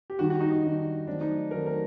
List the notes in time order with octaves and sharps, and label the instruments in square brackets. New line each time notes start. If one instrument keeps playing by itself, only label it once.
[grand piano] G4
[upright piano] D#3 G3 D4 [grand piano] F#4
[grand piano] F#4
D#4
D#4
[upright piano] D#3 G3 D4
[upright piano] D#3 F#3 A3 C4 [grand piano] D4
[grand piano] D#4
[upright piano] D#3 F#3 A3 C4 [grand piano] A#4
[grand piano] A#4